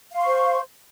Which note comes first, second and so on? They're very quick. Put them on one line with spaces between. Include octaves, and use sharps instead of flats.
F5 C6 C#6 C5